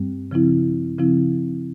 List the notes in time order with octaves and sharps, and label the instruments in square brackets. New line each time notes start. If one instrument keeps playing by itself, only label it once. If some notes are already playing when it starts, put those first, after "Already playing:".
Already playing: [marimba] G2 G3 C4
C#3 F3 C4 E4
C#3 F3 C4 E4